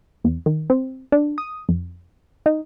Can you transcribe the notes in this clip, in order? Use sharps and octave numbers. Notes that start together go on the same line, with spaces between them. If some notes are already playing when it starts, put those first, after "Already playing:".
E2
D#3
C4
D4
D#6
F2
D#4